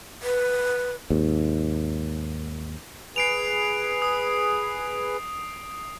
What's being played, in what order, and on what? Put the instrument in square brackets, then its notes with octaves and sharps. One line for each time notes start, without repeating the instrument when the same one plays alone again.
[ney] B4
[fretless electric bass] D#2 G#2
[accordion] G#4 B4 [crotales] C7 D7 F7
[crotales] D#6